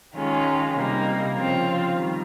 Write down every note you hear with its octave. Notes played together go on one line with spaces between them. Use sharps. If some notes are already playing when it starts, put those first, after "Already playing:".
D#3 G#3 C#4 F4
C3 G3 A#3 D#4
C#3 F3 C4 F4
D#3 G3